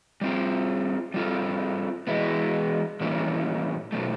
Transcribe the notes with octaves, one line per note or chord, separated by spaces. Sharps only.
G3 C4 F4
G3 C4 F4 A4
E3 G#3 B3 E4
A2 E3 G3 A#3 C#4
B2 F#3 A3